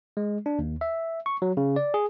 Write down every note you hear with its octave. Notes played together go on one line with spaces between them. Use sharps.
G#3
D4
D#2
E5
C#6
F#3
C#3
D5
G#4